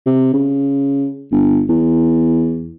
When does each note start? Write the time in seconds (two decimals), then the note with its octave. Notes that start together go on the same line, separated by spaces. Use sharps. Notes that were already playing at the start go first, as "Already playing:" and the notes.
0.06 C3
0.33 C#3
1.32 G1
1.69 E2